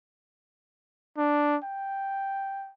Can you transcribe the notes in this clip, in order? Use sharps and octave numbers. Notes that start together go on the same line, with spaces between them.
D4
G5